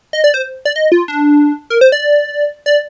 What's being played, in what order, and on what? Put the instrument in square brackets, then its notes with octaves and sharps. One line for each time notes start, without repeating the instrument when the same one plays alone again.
[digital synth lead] D#5
D5
C5
D5
D#5
F4
D4
A#4
C5
D5
D5